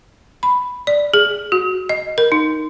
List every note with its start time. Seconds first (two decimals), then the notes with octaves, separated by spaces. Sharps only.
0.43 B5
0.87 D5
1.14 G#4
1.52 F#4
1.89 D#5
2.18 A#4
2.32 D#4